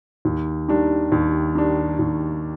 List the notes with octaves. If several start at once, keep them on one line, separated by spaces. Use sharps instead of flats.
D#2
D#3 G3 D4
D#2
D#3 G3 D4
D#2